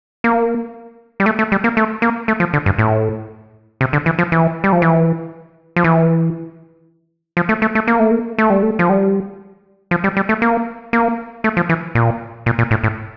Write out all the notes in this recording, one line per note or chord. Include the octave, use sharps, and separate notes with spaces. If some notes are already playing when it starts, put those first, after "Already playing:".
A#3
G3
A3
A3
G3
A#3
A3
A#3
A3
F3
D3
G2
A2
C3
D3
E3
F3
E3
G3
F3
E3
F3
E3
F3
A3
A3
A3
A#3
A3
A#3
A3
G3
A3
F3
G3
F3
G3
G3
A3
A#3
A#3
A3
F3
E3
A#2
A#2
A#2
A2
A2